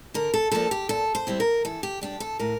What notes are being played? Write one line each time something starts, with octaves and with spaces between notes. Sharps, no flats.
D3 A#4
A4
F3 A#3 D4 A4
G4
A#2 A4
C5
G3 C4 E4
A#4
E3 A4
G4
G3 D4 G4
A4
A2 A#4